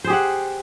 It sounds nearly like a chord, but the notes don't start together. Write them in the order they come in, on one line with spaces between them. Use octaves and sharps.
C5 G#4 G4 F#5